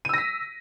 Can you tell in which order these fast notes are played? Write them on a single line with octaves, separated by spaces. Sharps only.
D#7 E6 A#6 B6